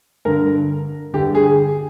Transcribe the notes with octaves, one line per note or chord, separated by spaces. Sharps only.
G2 D3 A#4
G2 D3 G4
G#4